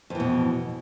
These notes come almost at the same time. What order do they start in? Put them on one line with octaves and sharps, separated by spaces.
F2 E3 B2